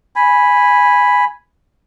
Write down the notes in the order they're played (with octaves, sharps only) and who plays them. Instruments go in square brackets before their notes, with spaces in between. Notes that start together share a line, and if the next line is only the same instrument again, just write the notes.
[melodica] G#5 B5